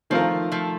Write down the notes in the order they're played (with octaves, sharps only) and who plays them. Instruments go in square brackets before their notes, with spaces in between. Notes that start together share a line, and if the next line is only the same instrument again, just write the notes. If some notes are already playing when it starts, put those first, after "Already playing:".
[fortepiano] D#3 A3 C4 F4 A#4 [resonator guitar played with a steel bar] F3
[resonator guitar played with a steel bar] F3 A3